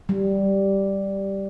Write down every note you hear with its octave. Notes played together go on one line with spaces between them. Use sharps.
G3